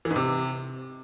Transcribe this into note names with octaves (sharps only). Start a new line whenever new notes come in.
E3
G#2
C3